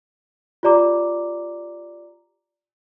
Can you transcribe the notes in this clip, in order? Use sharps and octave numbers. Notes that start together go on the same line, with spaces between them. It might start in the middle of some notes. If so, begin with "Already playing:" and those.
F4 G4 D5 A#5 D6